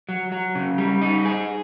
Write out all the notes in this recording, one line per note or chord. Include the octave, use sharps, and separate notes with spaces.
F#3
F#3
C#3
G3
D#4
G#4